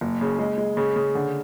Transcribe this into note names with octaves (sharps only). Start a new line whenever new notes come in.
F#1
C#3
G#3
G#3
C#3
C#3
D3